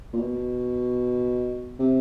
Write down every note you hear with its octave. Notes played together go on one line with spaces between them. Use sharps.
A#2
B2
C3